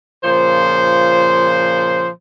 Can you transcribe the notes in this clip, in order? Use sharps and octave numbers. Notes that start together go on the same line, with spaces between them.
A#2 C#3 F3 C5